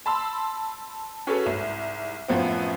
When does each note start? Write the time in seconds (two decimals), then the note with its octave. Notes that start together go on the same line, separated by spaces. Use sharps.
0.06 A5 B5 C6 E6
1.27 C#4 F#4 G#4 A4 B4 C#5
1.46 C2 G#2
2.28 F#2 A2 F3 B3 C4